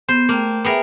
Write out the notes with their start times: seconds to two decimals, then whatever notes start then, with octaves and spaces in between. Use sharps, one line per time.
0.09 B3 C5
0.29 A3 A#3 G5
0.64 B3 G#4 A#4 E5 G5